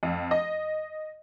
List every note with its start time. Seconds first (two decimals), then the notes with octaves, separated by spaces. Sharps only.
0.03 F2
0.31 D#5